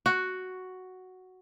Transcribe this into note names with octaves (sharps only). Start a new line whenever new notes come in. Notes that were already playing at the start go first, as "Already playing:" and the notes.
F#4